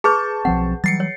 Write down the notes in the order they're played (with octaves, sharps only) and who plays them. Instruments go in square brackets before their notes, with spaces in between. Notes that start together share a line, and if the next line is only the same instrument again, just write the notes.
[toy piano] G#4 B4 [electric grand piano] A5 C#6 G6
[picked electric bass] B1 F3 C4 [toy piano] F#5
[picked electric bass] E3 F#3 G3 [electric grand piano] A6 C7 C#7
[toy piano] C#5